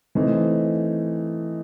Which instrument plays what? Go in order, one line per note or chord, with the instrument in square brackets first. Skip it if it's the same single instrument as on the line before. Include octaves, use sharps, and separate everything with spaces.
[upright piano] E3 A3 C4 D#4